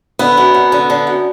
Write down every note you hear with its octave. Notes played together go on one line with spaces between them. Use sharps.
D3 B3
F#2
F#2
D3
D3
F#2